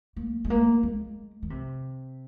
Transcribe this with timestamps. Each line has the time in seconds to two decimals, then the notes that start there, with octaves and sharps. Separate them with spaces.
0.16 A#3
0.45 G#3
0.50 A#3
0.83 G#3
1.42 D#3
1.50 C3